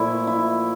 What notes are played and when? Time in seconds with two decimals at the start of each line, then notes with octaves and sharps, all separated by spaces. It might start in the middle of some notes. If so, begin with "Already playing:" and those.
Already playing: A#2 F3 A3 E4
0.27 E4